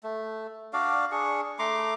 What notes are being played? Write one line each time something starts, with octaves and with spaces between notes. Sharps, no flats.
A3
D4 F#4 D5 F5
D4 G#4 C#6
A3 A#5 C6 D6